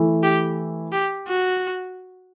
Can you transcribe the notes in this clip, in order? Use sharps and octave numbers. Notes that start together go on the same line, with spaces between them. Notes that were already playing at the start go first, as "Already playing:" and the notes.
Already playing: E3 A3 E4
G4
G4
F#4